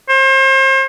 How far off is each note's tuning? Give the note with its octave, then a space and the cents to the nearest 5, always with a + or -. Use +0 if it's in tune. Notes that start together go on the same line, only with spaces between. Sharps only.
C5 +35